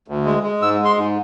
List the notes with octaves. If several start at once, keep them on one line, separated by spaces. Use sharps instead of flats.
D2
G#3
G#3
G#2 E6
G#3
C6
G#2